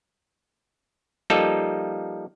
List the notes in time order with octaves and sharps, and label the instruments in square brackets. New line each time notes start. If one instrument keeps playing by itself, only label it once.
[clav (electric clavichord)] F3 G3 A#3 D#4 A4